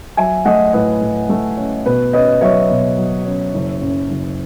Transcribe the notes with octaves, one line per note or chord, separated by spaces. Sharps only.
F#3 E5 G#5
A3 D#5 F#5
A2 B4 D#5
A2
A3
C#4
B2 B4
C#4 B4 D#5
F#3 C#5 E5
B2
F#3
C#4
F#1
F#2
F#1